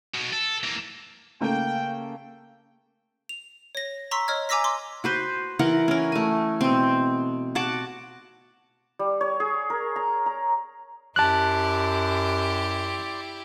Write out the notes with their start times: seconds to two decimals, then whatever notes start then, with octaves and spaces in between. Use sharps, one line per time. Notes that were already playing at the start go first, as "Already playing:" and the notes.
0.14 B2 F#3
0.33 A4
0.63 E3 A#3
1.41 C#3 A3 A#3 G5
3.29 F7
3.75 C#5 A#6
4.11 A#5 C6 C#6 E6 B6
4.28 C#5 D#5 F6 G#6
4.49 G#5 A#5 D6 E6 A#6 B6
4.64 C6 D6
5.04 F#4 B4 C5
5.59 E3 A#4 F#5
5.88 C#4 A#4
6.12 A3 G#5
6.61 B2 C4
7.55 F#4 F#5 A5 D6
8.99 G3
9.21 C#5
9.40 G#4
9.70 A#4
9.96 A#5
10.26 A#5
11.16 F#2 E4 G4 D5 A5 C6 F#6